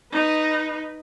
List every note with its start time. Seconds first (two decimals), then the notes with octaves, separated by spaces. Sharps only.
0.12 D#4 B4